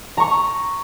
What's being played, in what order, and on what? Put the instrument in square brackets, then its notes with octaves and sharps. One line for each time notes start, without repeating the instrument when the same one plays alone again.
[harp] A#5 C#6